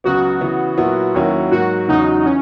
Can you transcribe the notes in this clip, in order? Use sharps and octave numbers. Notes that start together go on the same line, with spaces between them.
C#2 C#3 F#3 B3 F#4
C#3 E3 B3
A#2 F#3 B3 E4
D#2 D#3 F#3 C#4 E4
G#2 F#3 A#3 F#4
E2 C#3 F#3 D#4
E3 C#4